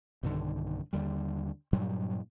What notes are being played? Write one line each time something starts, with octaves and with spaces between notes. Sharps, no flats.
B1 G2 D3 D#3
D#2 D3 G3
G2 A#2 F#3 G3